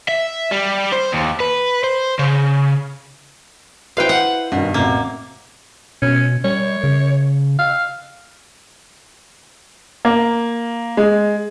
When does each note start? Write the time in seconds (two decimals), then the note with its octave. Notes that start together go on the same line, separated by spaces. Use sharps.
0.08 E5
0.51 G3
0.93 C5
1.13 D#2
1.40 B4
1.84 C5
2.19 C#3
3.97 E4 B4 C5 F5 G5
4.09 F#5
4.52 G2 B2 D#3
4.74 A1 C3 A#3
6.02 B2 C#4
6.44 G3 C#5
6.84 C#3
7.59 F5
10.05 A#3
10.97 G#3